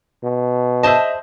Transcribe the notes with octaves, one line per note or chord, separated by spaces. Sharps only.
B2
G#4 C5 D#5 E5 A5